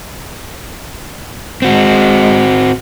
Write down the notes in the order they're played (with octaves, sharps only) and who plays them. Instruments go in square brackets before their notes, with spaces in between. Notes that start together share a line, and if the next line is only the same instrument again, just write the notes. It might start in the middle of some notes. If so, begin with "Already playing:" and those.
[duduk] G#3 [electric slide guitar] C4 F#4